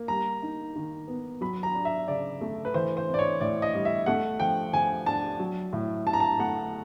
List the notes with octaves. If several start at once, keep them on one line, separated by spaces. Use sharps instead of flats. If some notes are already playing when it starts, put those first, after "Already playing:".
Already playing: A#3
G3 A#5
D#4
D#3
B3
F#3 B5
A#5
D4
E5
C#3 D5
A3
B4
E3 C5
C5
C4
D5
C#5
A2 D5
D#5
G3
E5
A3 F#5
F3 G5
F3 G#5
D4 A5
F#3
A2
A2 A5
A#5
A5
A3 F#5